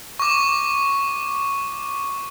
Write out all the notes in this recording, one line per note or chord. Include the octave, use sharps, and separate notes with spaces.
C#6 D6